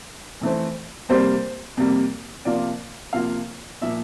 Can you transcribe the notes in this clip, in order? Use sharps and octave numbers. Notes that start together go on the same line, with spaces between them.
F2 E3 A3 C4
F2 C3 G3 A#3 C5
F2 C3 G3 A#3
C3 F3 A#3 F4 D5
C3 F3 A#3 F4 F5
A#2 F3 A#3 E5